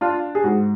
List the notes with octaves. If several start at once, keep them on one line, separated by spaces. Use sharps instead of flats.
D4 F4
G#4
G#2 F#4